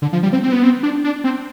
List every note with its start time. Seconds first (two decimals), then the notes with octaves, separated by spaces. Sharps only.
0.02 D3
0.13 F3
0.23 G3
0.33 C4
0.43 C4
0.52 B3
0.63 C4
0.83 D4
1.04 D4
1.24 C4